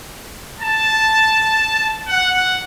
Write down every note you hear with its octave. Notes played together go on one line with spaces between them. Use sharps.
A5
F#5